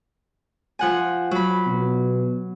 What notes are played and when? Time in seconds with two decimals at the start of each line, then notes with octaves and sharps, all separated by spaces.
0.79 F3 F#5 G#5
1.31 F#3 B5
1.67 B2